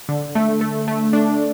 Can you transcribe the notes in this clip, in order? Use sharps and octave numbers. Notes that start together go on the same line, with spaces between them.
D3
A3
A3
A3
D4